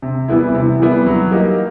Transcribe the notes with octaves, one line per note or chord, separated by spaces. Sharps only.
C3
E3 G3 B3 E4
C3
E3 G3 B3 E4
F#3
A#3 D#4 G4